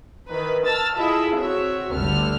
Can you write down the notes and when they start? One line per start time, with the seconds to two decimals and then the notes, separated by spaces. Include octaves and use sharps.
0.28 D#3 E3 B4
0.66 A5 E6 F6 A6
0.96 E4 F4 G#4 A4 D#5 E5
1.34 C4 F#4 C#5 E5
1.94 G1 D2 D3 G3 A4 F6